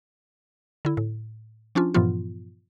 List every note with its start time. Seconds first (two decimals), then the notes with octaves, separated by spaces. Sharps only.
0.85 D3 E4
0.97 A2
1.75 F3 C#4 D4 F4
1.94 G2 A#2 E3 F3 B3 F4